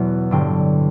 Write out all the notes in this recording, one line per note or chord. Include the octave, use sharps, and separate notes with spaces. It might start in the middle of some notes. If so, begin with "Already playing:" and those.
Already playing: E2 B2 F#3 F#5
A1 G2 D3 F#3 G5